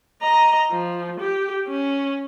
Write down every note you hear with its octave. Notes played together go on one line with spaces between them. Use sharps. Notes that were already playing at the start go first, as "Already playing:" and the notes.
D#5 A#5
F3
G4
C#4